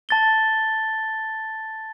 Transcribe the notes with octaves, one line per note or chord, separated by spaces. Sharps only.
A5 A6 G7